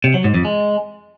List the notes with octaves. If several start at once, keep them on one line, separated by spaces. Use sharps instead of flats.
C3
F#3
G#2
F2
G#3